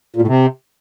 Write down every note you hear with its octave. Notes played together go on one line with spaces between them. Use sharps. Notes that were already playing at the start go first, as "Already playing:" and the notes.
A#2
A2
C3